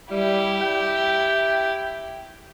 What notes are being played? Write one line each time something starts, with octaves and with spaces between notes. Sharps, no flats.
G3 E4 G4
G5